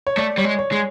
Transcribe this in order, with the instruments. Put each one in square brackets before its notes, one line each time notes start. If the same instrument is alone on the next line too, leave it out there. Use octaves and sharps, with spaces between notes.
[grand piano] C#5
[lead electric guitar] A3 [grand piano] D5
[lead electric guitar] G3 [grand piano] C#5
[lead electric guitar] G#3
[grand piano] C#5
[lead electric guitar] G#3